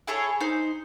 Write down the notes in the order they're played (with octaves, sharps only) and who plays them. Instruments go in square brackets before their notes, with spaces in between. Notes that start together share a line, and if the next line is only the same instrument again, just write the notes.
[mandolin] E4 G#4 A4 C#5
D#4 C5